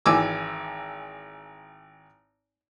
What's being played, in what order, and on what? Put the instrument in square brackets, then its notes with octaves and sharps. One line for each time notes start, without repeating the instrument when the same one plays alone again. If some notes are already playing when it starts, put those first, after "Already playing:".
[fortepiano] G#1 E3 G#5 D6 E6